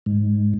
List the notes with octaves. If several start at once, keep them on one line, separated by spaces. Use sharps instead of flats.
G#2